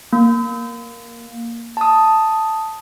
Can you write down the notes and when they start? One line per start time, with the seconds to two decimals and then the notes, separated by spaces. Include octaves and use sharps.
0.13 A#3
1.77 A5 D#6